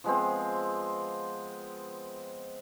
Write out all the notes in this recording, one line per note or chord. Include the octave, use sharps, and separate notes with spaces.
F3 G#3 B3 C4